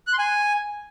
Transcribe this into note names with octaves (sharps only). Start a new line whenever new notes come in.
F#6
C6
G#5